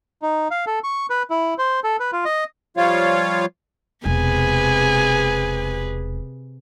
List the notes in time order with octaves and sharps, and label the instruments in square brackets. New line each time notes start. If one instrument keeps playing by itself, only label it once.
[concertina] D#4
F5
A4
C#6
B4
E4
C5
A4
B4
F4
D#5
[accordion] F3 G3 F4 C#5 F5
[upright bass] E1 [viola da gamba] C3 G#4 B4 [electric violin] G#5